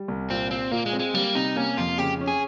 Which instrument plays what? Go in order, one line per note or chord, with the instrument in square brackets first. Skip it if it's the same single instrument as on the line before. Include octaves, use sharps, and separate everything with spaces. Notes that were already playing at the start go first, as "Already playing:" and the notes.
Already playing: [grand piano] G3
C2
[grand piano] A#2 [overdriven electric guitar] C4
[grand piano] A#2 [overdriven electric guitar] C4
[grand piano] A#2 [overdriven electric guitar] A#3
[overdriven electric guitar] G#3
[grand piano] C4
[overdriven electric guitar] G#3
[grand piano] G3 [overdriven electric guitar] A#3
[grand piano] C3 [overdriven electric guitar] D#4
[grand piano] A#3 [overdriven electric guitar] C#4
[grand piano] F2 [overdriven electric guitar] F4
[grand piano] C#3 [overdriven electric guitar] G4
[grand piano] C#4
[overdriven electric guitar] G#4